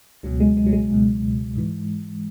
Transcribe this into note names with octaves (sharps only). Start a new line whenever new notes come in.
C#2 B2 F#3
G#3
G#3
F#3
G#3
C#2 B2
G#2 E3